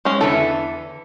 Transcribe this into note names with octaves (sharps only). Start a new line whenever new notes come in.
G#3 C#4
E2 D3 E3 A4